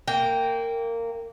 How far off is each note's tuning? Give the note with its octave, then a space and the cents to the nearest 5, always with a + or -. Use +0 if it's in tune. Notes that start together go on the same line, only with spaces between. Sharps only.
A#3 -20 G5 +0